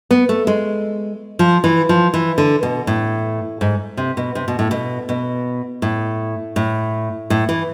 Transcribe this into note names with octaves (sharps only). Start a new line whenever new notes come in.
B3
A3
G#3
F3
E3
F3
E3
D3
B2
A2
G#2
C3
B2
C3
B2
A2
B2
B2
A2
A2
A2
E3